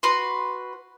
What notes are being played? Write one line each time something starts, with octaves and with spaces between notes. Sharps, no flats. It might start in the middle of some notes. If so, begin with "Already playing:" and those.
F#4 B4 C6